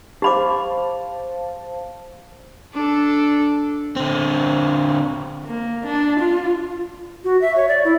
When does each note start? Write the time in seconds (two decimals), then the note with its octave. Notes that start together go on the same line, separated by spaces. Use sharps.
0.22 G4 C5 F5 A5 B5 D6
2.74 D4 A4
3.96 D3 C4
5.46 A#3
5.86 D4
6.20 F4
7.24 F#4
7.41 E5
7.56 C#5
7.68 D5
7.85 E4